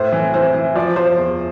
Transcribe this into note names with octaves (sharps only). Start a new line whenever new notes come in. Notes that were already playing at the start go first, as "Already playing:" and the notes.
Already playing: A2 C5
E3
E3 C5
E3
F3 D5
F3 C5
E2